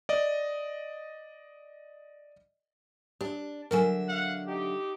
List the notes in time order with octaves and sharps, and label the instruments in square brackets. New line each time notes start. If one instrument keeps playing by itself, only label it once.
[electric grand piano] D5 D#5
[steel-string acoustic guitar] D4 [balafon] G4
[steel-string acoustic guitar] D3 F#3 E5 [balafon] A#4 G#5
[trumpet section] F5 F#5
D#4 G4